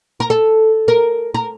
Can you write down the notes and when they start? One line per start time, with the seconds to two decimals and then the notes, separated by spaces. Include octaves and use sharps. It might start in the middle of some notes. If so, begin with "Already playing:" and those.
0.20 A#4
0.30 A4
0.88 A#4
1.34 A#4